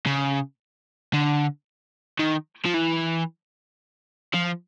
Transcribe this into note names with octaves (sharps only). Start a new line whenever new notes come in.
C#3
D3
D#3
F3
E3
F3